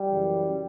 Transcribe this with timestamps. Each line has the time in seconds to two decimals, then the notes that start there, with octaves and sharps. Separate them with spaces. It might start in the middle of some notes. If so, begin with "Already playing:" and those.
Already playing: G3
0.09 F#2 C#3 E3